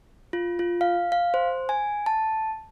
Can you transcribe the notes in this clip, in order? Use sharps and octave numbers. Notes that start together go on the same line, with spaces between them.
F4
F4
F5
F5
C5
G#5
A5